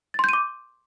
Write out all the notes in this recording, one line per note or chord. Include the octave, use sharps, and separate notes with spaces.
C6 D6 G6 A6 D#7